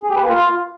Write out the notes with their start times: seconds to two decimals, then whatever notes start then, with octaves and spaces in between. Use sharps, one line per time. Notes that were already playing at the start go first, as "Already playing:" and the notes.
0.03 G#4
0.10 G4
0.16 B4
0.23 A#3
0.29 F4